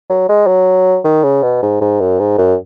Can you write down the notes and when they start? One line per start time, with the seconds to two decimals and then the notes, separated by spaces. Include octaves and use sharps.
0.09 F#3
0.29 G#3
0.47 F#3
1.04 D#3
1.23 C#3
1.43 B2
1.62 G#2
1.81 G#2
2.00 F#2
2.19 G#2
2.38 F#2